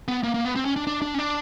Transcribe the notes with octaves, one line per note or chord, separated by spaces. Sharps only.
B3
A#3
A#3
B3
C4
C#4
D4
D4
D4
C#4
D4